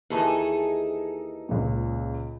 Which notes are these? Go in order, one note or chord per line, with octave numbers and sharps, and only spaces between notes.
D#2 E3 D#4 G#4 A4
C#2 A#2